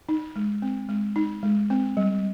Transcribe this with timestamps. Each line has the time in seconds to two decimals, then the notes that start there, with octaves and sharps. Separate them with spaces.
0.09 D#4
0.36 G#3
0.62 C4
0.89 G#3
1.16 D#4
1.43 G#3
1.70 C4
1.97 G3